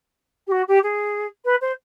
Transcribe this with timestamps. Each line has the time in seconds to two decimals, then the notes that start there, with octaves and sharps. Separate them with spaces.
0.47 G4
0.51 F#4
0.68 G4
0.83 G#4
1.45 B4
1.61 C5